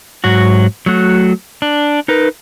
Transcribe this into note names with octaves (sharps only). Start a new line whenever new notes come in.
G#2 F#3 F#4
F#3 A3 F#4
D4
D#4 A#4 B4